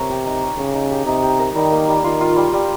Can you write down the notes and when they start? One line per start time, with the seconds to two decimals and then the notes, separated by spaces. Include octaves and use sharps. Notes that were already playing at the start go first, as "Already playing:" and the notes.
Already playing: C3 A#4 C#5
0.09 G4
0.26 D#4
0.42 C#5
0.58 C#3 C#5
0.74 D#4
0.90 G4
1.06 C3 D#4
1.23 G4
1.39 A#4
1.55 D#3 G3
1.72 A#3
1.88 G3
2.04 D#3 F4
2.21 F4
2.36 G3
2.53 G3